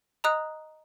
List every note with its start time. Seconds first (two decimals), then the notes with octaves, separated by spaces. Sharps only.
0.24 D#5 A#5 D#6 F#6